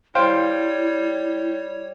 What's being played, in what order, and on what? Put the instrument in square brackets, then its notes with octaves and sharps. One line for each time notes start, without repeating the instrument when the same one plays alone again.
[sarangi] G3 [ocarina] E4 [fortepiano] C5 F5 G5 [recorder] C#5